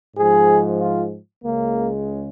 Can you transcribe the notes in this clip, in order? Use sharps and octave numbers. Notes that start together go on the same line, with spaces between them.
G#2 F3 G#3 G#4
F4
C#2 C#3 G#3 A#3